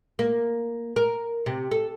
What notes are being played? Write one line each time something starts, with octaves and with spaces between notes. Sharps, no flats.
A#3
A#4
C3
A4